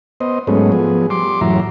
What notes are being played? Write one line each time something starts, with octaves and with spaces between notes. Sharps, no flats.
B3 C5 D#5
G#2 F#3 G#3 A3 B3 C#4
F3 B3 G#4
G3 C6 D6
F#2 A2 E3 F#3 E5 A#5